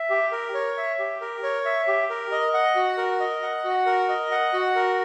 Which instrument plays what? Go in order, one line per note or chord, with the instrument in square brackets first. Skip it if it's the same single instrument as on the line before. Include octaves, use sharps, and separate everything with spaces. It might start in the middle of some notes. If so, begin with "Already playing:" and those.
Already playing: [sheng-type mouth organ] E5
G4
A#4
C#5
E5
G4
A#4
C#5
E5
G4
A#4
D#5
F#5
F#4
A#4
D#5
F#5
F#4
A#4
D#5
F#5
F#4
A#4